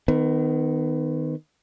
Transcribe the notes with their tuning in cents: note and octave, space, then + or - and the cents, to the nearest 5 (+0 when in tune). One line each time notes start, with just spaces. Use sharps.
D#3 +0 B3 +35